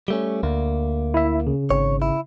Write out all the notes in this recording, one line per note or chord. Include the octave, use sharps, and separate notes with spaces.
G3 A3 C#4
D2 A#3
E4 E5
C#3
G#1 C#5
E4